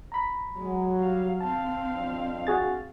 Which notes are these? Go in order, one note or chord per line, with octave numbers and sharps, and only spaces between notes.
A#5 B5
F#3 G#3
G3 F5
C4 F5 A5
F2 D4
F#4 G#4 A6